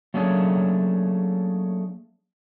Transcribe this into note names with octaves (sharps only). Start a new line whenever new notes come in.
F#3 A3 A#3 C#4 D4 G#4